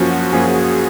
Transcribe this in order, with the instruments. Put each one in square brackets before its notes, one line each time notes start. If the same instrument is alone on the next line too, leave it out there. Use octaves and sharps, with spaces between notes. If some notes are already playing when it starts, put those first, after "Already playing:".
Already playing: [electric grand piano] F#2 F3 A#3 C#4 [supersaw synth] F#4
[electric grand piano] F#2 F3 A#3 C#4 [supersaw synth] G#4